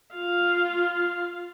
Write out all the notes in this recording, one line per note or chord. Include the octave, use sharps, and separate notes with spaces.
F4 F5